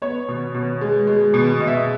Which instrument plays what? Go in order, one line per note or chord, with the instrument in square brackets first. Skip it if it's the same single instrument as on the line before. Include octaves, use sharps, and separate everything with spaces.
[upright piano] B3 C#5
B2
B2
G#3
G#3
B2
B2 D#5
E5
D#5